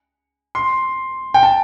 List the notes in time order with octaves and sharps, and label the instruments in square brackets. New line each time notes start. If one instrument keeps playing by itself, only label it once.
[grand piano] C6
G5
A5